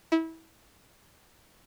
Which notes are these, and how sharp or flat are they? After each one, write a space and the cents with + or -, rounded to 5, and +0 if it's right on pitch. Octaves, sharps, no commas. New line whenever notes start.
E4 -25